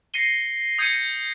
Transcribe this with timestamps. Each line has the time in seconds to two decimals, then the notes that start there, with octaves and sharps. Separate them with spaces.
0.14 A#6 C7 C#7 D#7 G7
0.78 D#6 G6 G#6 A#6 C#7 D#7